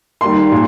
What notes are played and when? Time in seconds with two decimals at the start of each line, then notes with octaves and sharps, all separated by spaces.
0.21 D#3 G3 A#3 C6
0.52 A#2